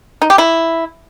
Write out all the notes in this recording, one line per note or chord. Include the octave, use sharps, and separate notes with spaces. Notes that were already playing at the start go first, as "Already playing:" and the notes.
D#4
G4
E4